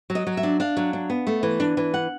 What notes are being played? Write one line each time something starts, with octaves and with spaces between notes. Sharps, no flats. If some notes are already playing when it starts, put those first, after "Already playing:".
F#3
D#5
F#3
E5
D4
D4 F5
F#3
D4
B3
A3
E3
D4
E3
F#5